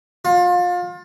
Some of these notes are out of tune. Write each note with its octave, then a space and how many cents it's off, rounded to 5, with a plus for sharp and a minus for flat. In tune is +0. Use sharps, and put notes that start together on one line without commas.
F4 +30